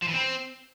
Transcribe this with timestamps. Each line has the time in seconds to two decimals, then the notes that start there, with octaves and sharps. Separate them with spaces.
0.02 F3
0.08 E3
0.14 C4